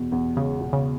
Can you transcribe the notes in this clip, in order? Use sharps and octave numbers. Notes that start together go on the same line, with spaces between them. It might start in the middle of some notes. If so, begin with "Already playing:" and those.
Already playing: E2 B2
E2
C#3 G#3
B2
C#3